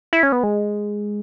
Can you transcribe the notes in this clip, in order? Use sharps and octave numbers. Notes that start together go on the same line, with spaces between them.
E4
C#4
B3
G#3